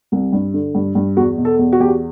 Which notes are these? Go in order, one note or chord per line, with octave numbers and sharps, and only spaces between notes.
C2
G2
D3
G2
G2
E2 F#4
B2
A4
E2
F#4
E2 G4
F#4